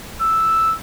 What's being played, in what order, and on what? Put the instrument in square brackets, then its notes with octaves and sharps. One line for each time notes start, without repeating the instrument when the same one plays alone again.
[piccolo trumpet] E6